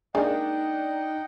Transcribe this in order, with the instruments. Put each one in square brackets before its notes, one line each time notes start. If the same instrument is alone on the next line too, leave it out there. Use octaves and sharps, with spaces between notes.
[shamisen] G#3 A#3 G#4 [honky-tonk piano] D4 [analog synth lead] D#4 [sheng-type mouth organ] D#5 F#5 G5